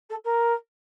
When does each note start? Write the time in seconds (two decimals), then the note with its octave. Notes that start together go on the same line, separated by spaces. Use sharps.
0.10 A4
0.24 A#4